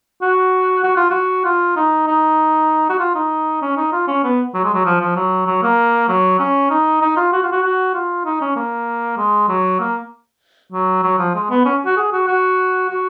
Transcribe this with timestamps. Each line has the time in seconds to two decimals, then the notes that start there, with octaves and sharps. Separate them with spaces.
0.22 F#4
0.84 F#4
0.97 F4
1.11 F#4
1.45 F4
1.76 D#4
2.07 D#4
2.90 F#4
2.99 F4
3.15 D#4
3.62 C#4
3.77 D#4
3.93 F4
4.08 C#4
4.24 B3
4.54 F#3
4.64 G#3
4.74 F#3
4.86 F3
5.01 F3
5.16 F#3
5.47 F#3
5.63 A#3
6.09 F#3
6.40 C#4
6.71 D#4
7.01 D#4
7.17 F4
7.33 F#4
7.43 F4
7.52 F#4
7.63 F#4
7.94 F4
8.25 D#4
8.41 C#4
8.56 A#3
9.17 G#3
9.49 F#3
9.80 A#3
10.73 F#3
11.03 F#3
11.19 F3
11.35 G#3
11.50 B3
11.65 C#4
11.86 F#4
11.97 G#4
12.12 F#4
12.27 F#4
12.89 F#4